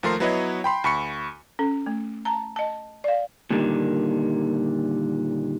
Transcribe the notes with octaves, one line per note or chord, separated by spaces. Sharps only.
D#2 F3 A3 A#4 C6 C7
F#3 B3 E4 B4 C#5 D#5
G5 B5 C6
D2 B5 C#6 C#7
C#4 A4
A3
A5 A#5
D#5 A5
D5 F5
A#2 D3 D#3 G3